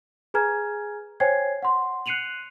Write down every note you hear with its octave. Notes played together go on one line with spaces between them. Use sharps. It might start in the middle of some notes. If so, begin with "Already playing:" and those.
G#4 B4 G#5 A#5 F6 G#6
C5 C#5 G5 G#5 G#6 C7
F#5 C6
F#6 C7 C#7 D#7 F7 F#7